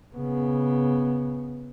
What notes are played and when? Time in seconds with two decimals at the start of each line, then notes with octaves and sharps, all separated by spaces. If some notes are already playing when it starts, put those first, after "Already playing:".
0.16 C#3 B3